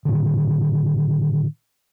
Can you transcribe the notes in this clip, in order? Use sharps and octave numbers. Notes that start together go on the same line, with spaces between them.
A2 D3 D#3